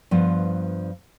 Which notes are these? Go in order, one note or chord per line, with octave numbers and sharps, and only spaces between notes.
G2 F3 B3 C5